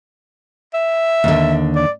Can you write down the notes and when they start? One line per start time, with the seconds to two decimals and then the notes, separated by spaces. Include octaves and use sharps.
0.74 E5
1.24 D#2 D3
1.75 D5